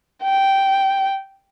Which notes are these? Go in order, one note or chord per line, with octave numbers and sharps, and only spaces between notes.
G5